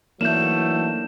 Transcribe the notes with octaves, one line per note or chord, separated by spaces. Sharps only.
E3 F#3 A3 A#3 D4 D#4 G6 E7